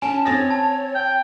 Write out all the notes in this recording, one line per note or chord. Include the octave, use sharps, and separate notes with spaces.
C#4 G#5 A5
C4 C#5 A6 A#6
A5
G5